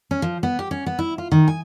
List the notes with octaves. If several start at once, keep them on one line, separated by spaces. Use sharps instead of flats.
C#4
F3
B3
G4
C#4
B3
E4
F4
D#3
G#5